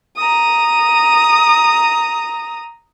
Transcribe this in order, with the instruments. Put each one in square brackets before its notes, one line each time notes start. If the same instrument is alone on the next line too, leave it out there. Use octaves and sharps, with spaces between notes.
[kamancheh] A#5 D#6